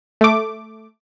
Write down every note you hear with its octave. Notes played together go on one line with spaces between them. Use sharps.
A3 D6